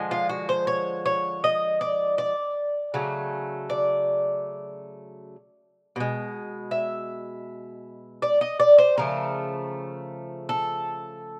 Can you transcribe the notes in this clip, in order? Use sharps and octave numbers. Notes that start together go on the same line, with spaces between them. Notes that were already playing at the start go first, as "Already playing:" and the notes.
Already playing: D3 F3 G#3
F4
F#4
C5
C#5
C#5
D#5
D5
D5
C#3 F#3 A3
D5
B2 G#3
E5
D5
D#5
D5
C5
C#3 F3 A3 A#4
A4